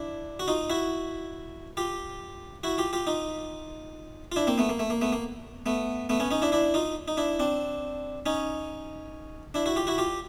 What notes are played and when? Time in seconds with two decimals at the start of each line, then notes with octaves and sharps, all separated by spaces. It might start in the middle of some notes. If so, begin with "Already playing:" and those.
Already playing: D4 E4
0.40 F#4
0.48 D#4 F4
0.70 E4 F#4
1.77 F4 G4
2.64 E4 F#4
2.78 F4 G4
2.93 F4 G4
3.07 D#4 F4
4.32 F4
4.36 D4 E4
4.47 A#3 C4
4.58 A3 B3
4.69 A#3
4.79 A3
4.90 A#3
5.02 A3 B3
5.13 A#3
5.66 A3 B3
6.09 A3 B3
6.20 B3 C#4
6.31 C#4 D#4
6.42 D4 E4
6.52 D4 E4
6.74 D#4 F4
7.08 D#4
7.17 D4 E4
7.39 C4 D4
8.26 C#4 D#4
9.54 D4 E4
9.66 E4 F#4
9.76 F4 G4
9.87 E4 F#4
9.98 F4 G4